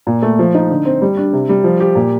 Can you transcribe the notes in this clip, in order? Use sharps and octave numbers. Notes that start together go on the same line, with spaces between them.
A#2
A3
F3
D#4
D3
C4
G3
D4
C3
G3
F3
G4
A#2